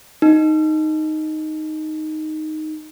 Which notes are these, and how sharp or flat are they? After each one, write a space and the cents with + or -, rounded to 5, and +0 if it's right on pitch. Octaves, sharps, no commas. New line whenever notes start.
D#4 +0